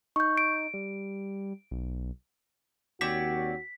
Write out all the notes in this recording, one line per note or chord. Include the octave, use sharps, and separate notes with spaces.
D#4 C#6 G6
D7
G3
B1
D#2 C4 F#4 C#5 D5 B6